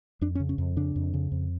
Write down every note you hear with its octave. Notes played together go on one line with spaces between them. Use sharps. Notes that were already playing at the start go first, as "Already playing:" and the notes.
F2 D4
C#4
C#3
C#4
F2
C#3 D4
F2
C#3
F2